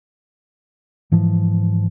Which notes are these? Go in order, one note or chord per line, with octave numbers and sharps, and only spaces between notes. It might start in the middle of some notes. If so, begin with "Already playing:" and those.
G#2 E3 F3